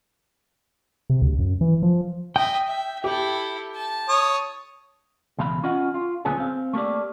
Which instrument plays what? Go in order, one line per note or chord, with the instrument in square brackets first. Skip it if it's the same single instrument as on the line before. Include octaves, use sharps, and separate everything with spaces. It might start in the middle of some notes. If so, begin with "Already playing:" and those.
[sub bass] C3
D2
F#2
E3
F3
[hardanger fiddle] D#5 E5 [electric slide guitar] G5
[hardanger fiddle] E5
[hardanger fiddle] E4 A4 [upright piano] G4
[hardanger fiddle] A5
[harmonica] C#5 D#6
[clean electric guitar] C#2 B2 E3 F5 B5
C#4 F4 D#5 F#5
F4
D2 A#2 F#3 B3 C#4 G#4
C4 F5
A3 A#3 G4 D5